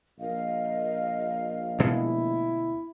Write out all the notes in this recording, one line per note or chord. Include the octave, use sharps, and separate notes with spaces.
A#1 A#4 D#5 F5
D2 B2 G#3 E4